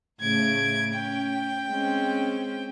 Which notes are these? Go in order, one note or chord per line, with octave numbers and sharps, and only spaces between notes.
A2 C#3 A3 G#6 D7
C#4 G5
G#3 C4 C#4